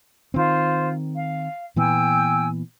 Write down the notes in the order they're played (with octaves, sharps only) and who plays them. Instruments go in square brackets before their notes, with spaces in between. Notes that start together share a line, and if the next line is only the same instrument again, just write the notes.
[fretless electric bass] D#3 C4 [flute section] F4 C5
[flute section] F5
[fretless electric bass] A#2 E3 B3 [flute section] G5 G#5 E6